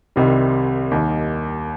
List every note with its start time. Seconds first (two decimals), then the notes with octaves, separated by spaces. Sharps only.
0.16 C2 C3 D#3 G3
0.91 D#2 D#3